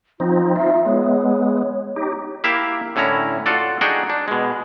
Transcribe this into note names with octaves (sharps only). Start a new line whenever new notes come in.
F3 C4 D#4 F4
D#4 F4 E5
G#3 B3 C#5
D#4 G4
A#3 E4 G4 E5 F5
A2 D3 C#4 E4 A#5
F4 F#4 A4 D5
D4 D#4 F#4 G#4 G5
D4
B2 G#3